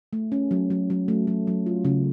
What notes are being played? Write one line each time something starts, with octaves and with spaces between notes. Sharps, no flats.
A3
C#4
F#3
F#3
F#3
A3
F#3
F#3
F4
C#3